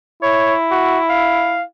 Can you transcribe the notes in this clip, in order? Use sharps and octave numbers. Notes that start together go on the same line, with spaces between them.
E4 C#5
F#4
F5